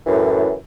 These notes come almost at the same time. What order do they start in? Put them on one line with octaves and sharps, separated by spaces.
E3 F#2 A2